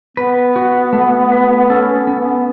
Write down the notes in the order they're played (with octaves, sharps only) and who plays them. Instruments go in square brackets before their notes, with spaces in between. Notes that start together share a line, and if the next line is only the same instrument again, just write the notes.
[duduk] B3 [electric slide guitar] B4
[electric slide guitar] F#4
A3
B4
[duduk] C#4 [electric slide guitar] A4
[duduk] B3
[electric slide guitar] C#4
[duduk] B3